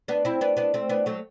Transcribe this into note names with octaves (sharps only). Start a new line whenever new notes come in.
B3 D4
C4 E4
B3 D4
B3 D4
A3 C4
B3 D4
F#3 A3